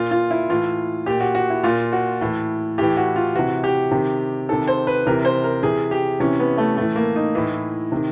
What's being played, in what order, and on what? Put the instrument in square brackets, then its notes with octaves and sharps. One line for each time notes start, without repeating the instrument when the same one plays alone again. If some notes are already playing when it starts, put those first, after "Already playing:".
Already playing: [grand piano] A#2 F4
F4
E4
A2 E3 F4
A#2 G4
F#4
F#4
E4
A#2 F4
F#4
A2 E3
A2 E3 G4
F#4
F4
C3 E3 F#4
G4
C3 D#3
C3 D#3 A4
C5
B4
C3 E3 A#4
C5
A#4
C3 E3 G#4
G4
C3 E3 C#4
B3
A3
A2 E3 A3
A#3
D#4
A2 E3
C3 D#3